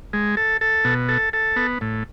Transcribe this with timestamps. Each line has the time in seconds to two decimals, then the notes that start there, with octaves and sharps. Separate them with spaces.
0.13 G#3
0.37 A4
0.61 A4
0.85 B2
1.09 A4
1.33 A4
1.56 B3
1.81 A2